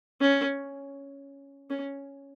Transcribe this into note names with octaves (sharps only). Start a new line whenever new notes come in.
C#4
C#4